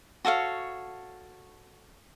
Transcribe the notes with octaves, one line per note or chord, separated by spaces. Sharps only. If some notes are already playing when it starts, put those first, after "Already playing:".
F#4 A4 C#5 F5